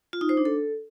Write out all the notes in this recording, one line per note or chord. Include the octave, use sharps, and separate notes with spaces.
F4
D#4
C5
D4
A4